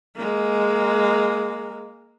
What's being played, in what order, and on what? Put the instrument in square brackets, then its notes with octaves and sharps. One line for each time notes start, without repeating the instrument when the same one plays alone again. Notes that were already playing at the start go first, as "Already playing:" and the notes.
[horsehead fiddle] G#3 A#3